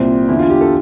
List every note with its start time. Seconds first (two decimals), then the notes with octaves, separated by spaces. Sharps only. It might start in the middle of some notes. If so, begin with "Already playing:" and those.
Already playing: C2 A#2 C4
0.28 E2 D3 E4
0.39 F4
0.50 G4
0.61 A4